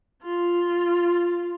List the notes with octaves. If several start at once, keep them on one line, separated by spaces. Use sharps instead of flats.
F4